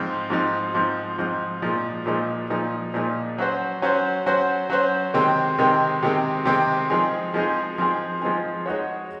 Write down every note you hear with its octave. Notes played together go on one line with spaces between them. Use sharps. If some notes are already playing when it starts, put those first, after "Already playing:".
Already playing: G#2 F3 C4 D#4
G#2 F3 C4 D#4
G#2 F3 C4 D#4
G#2 F3 C4 D#4
A#2 F3 G#3 D#4
A#2 F3 G#3 D#4
A#2 F3 G#3 D#4
A#2 F3 G#3 D#4
F#3 C#4 F#4 C5
F#3 C#4 F#4 C5
F#3 C#4 F#4 C5
F#3 C#4 F#4 C5
C3 D#3 G#3 C4
C3 D#3 G#3 C4
C3 D#3 G#3 C4
C3 D#3 G#3 C4
F3 G#3 C4 D#4 G#4
F3 G#3 C4 D#4 G#4
F3 G#3 C4 D#4 G#4
F3 G#3 C4 D#4 G#4
G#3 D#4 F#4 C#5